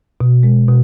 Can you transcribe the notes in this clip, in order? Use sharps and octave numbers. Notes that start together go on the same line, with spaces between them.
B2
G#3
B2